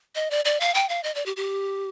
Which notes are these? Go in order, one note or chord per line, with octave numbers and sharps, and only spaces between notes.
D#5
D5
D5
F5
G5
F5
D#5
D5
G4
G4